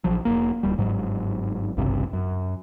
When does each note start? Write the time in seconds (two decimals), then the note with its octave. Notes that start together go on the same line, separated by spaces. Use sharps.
0.04 A#1 F3 F#3
0.25 F1 C#2 A#3
0.63 D1 G3
0.78 G1 G#2 F#3
1.77 G#1 C#2 G2 C3
2.13 F#2